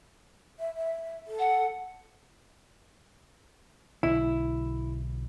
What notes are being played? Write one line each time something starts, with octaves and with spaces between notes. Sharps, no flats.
E5
E5
A4
F#5
B1 D3 E4